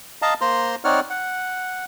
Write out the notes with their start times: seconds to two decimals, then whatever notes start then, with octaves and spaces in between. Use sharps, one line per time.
0.22 D#5 F5 A5 A#5
0.41 A#3 C5 A#5 C6
0.84 C4 D#4 C#5 D5 F#5 F6
1.10 F#5